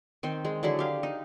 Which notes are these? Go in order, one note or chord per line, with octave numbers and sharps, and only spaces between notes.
D#3 C4 C5
G#3
D3 F#3 E4 G#4
G4 F5
D#4